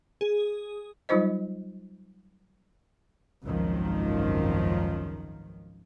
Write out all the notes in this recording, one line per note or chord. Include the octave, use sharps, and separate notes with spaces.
G#4
F#3 G3 D#4 F4 C5 D#5
G#1 C#2 F#2 D#3 F3